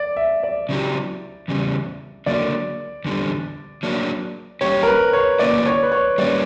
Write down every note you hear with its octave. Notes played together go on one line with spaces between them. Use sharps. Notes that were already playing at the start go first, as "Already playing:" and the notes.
Already playing: D5
E5
D5
C#3 F#3 A#3 E4 G4
E2 C#3 G3
D3 F#3 A#3 D5
E2 D3 G3
F#3 A#3 D4
G3 A#3 C#4 G4 C#5
A#4
B4
C#5
D3 A#3 C#4 E4 B4 D5
C#5
B4
C#5
G3 A#3 C#4 D5